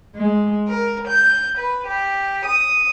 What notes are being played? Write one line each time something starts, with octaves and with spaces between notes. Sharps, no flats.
G#3
A#4
G6
B4
G4
D#6